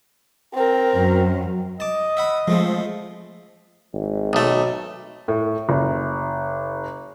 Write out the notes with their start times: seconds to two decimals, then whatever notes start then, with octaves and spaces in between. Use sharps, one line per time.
0.54 C4 A#4
0.95 F#2
1.80 D#5 A5 D6
2.17 E5 F#5 B5
2.47 F3 G#3 A3 C4
3.93 G#1
4.33 B1 A3
5.28 A2
5.69 F#1